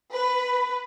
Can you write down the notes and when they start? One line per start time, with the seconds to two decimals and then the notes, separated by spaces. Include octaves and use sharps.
0.13 B4